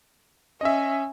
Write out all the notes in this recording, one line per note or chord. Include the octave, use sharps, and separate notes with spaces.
C#4 D#5 E5